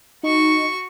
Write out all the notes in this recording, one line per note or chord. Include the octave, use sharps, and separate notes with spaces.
D#4 F#4 C#6